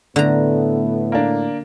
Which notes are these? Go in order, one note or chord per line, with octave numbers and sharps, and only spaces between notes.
A2 D3 A3 B3 A#5
A#3 D4